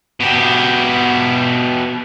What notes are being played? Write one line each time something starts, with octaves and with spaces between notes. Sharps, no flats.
B2 G4